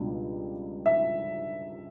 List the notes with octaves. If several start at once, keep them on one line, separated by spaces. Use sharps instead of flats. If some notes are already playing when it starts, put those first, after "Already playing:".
Already playing: C#2 B2 G3 D4
E5